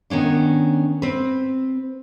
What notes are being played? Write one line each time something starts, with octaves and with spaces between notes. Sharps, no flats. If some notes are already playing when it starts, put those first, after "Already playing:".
D#3 B3 C#4 D4
C4 B4